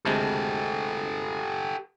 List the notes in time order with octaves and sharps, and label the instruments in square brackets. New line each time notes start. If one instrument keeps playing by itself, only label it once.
[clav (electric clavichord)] D2 C3 G#3 [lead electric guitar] G4 A4